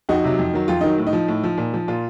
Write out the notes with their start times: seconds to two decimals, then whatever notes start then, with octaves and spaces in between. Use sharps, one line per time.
0.09 F2 D#4 F#4
0.24 C3 F#3
0.39 F2
0.54 D#3 F#3
0.68 F2 F4
0.81 D#3 F#3 D#4
0.98 A2
1.07 D#4
1.13 F3
1.28 A2
1.44 F3
1.58 A#2
1.74 F3
1.88 A#2 F4